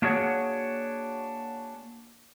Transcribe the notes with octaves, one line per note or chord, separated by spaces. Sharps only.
A#3 D4 F#4 G#4 C#5 F#5